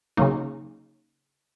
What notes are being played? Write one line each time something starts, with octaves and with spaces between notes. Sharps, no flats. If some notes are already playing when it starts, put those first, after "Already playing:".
C#3 F#3 A#3 D#4